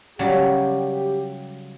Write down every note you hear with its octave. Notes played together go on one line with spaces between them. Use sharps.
C#3 F#3 G3 G4